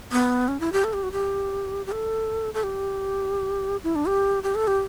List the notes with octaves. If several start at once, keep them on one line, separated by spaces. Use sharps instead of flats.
B3
C#4
E4
G4
A4
G4
F#4
G4
G4
A4
A4
G4
E4
D4
G4
G4
A4
G4